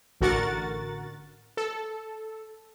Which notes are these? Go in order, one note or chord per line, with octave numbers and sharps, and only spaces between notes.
A1 D3 F#4 A#4 F#5 A6
A4